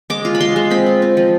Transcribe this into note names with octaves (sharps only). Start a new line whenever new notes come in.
G#3 D6
F4
B5
G#3 C6
G#3
C4 B5
F4
C4
F3